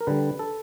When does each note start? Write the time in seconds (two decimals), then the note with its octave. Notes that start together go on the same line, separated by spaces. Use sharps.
0.01 A#4
0.07 D3 G3 B4
0.39 A4